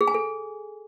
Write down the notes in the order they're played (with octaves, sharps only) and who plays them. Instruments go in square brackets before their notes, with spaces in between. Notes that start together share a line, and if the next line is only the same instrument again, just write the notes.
[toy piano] G#4
G#5
A4